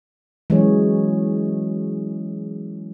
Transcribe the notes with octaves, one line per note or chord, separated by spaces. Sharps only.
E3 F#3 G#3 C#4 G#4 C#5